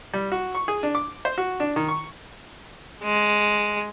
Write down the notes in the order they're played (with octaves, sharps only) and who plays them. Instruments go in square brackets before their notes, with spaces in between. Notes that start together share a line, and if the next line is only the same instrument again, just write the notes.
[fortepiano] G3
F#4
C#6
G#4
D4
D6
C5
F#4
D4
D#3
C#6
[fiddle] G#3